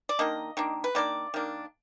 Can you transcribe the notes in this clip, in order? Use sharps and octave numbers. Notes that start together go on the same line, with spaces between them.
D5
D#3 A#3 D4 D#5
D#3 A#3 D4
B4
D#3 A#3 D4 D5
D#3 A#3 D4